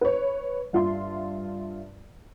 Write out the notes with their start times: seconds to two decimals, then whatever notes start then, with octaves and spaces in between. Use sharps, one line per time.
0.01 B4 C#5
0.73 G2 F4 E5 C6